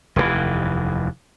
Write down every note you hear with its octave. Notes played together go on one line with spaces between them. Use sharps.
F1 D#2 G#2 E3